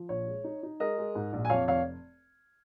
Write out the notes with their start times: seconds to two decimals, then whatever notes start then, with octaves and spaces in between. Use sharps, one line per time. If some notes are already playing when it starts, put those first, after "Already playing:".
Already playing: F3
0.09 A#1 C#5
0.27 G#3
0.44 D#4
0.63 D#4
0.80 G#3 A#4 D#5
0.98 G#3
1.15 G#2
1.33 A#1
1.45 G#5
1.50 F2 C#5 F5
1.67 F1 C#5 F5